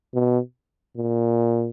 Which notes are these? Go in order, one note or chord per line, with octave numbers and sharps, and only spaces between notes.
B2
A#2